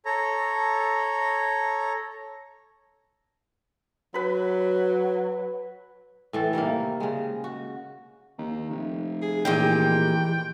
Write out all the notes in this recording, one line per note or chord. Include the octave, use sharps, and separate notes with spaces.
A4 C#5 A#5
F#3 B4 B5
A2 E3 A4
C3 D#3 G3 A#3
C#3 G#3
F#4
D#2
F1
G#4
A#2 E3 G#3 G4 G5